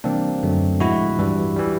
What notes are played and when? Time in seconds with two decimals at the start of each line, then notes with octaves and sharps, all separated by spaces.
0.04 C3 E3 G3 A#3 C4 D4
0.43 F#2 D3 F#3 A3
0.80 A2 F3 G#3 E4 F#4
1.19 G2 E3 G3
1.56 E3 G3